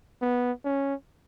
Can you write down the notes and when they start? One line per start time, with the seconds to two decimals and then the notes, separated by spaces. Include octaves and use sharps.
0.22 B3
0.65 C#4